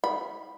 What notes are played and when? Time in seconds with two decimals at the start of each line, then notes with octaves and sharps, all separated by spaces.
0.04 B5